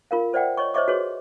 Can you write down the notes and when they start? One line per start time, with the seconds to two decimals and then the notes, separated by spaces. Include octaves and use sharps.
0.11 F4 A#4 F5
0.33 A4 C5 D5 E5 F#5 G5
0.57 C#5 D#5 C#6
0.74 C5 C#5 D#5 E5 C#6 D6
0.88 F#4 G#4 A4 B4 C#5